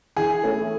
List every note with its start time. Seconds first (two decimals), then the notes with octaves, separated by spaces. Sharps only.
0.17 E3 G#4
0.43 A3 C#4 E4 A4